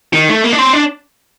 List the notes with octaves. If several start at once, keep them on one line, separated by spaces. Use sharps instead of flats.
D#3
A3
A#3
D4
C4
D4